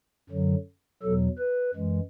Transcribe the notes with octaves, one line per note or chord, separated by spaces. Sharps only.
F#2 D3 F#3
E2 B2 F#3 A4
B4
F#2 E3 G#3